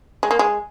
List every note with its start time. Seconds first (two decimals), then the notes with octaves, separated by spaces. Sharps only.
0.23 G#3
0.31 A#3
0.39 G#3